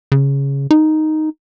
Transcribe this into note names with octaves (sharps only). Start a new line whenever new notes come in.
C#3
D#4